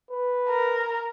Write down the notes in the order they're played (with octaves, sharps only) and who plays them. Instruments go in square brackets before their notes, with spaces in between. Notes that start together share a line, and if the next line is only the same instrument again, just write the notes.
[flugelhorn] B4
[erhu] A#4